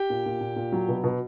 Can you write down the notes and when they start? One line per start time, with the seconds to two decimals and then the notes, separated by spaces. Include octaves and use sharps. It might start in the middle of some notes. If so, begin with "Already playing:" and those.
Already playing: G4 G5
0.10 A#2
0.26 A#2
0.40 A#2
0.56 A#2
0.73 F#3
0.88 B2
1.03 B2